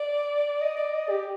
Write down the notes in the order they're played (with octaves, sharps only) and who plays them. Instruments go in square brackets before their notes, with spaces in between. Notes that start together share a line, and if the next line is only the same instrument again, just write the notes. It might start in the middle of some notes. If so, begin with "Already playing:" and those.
Already playing: [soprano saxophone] D5
D#5
D5
D#5
G4